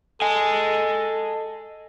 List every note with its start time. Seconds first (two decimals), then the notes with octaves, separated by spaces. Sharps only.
0.22 A4 D#5 G#5